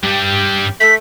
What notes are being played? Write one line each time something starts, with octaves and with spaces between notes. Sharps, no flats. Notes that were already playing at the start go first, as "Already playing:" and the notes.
G2 G3 G4
A3 B6